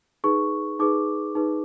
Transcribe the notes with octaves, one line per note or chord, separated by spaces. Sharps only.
D#4 G#4 B4 C#6
D#4 G#4 B4 D6
D#4 G#4 B4